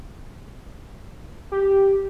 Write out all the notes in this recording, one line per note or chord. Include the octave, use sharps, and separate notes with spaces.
G4